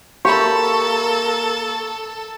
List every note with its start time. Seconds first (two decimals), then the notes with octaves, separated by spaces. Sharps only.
0.25 A#3 G4 A4 E5 B5 C#6